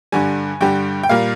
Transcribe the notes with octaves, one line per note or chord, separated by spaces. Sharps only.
G2 D3 G3 G#5
G2 D3 G3 G5
G5
A#2 G3 A#3 F5